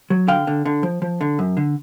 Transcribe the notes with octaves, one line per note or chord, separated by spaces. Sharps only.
F#3
D3 F5 G5
D3
D3
F3
F3
D3
F#2
D3